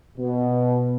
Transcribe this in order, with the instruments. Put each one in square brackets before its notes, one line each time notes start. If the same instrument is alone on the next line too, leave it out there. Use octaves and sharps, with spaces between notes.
[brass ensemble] B2